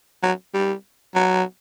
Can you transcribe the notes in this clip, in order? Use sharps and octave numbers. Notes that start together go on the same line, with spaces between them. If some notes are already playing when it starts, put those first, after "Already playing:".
F#3
G3
F#3